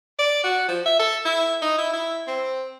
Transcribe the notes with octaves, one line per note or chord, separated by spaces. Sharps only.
D5
F#4
F3
E5
A4
E4
D#4
E4
E4
C4